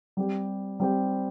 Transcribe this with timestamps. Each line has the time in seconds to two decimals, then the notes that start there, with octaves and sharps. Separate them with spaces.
0.17 G3 C4 G4
0.80 G3 C4 G4